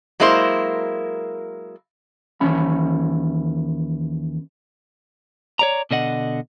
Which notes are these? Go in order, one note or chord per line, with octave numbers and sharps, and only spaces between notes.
F#3 G#3 A#3 E4 A#4 C5
D#2 E3 C#4 B5
C#5 D5 A#5
B2 D3 D#5 F#5